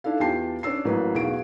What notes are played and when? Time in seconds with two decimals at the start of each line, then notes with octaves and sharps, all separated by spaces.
0.04 D4 E4 A4 F5
0.20 E2 F4 G4 G5 A5 C7
0.63 C#4 D4 D5 E6 C7
0.85 A1 A2 F#3 A#3 B4
1.14 B1 E2 F#4 G#4 F5 D7